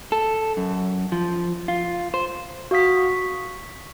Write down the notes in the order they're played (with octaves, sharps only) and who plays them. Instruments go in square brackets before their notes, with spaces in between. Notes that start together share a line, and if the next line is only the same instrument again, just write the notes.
[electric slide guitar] A4
F#2
F3
F4
C5
[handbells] F#4 F5 D#6 B6
C#6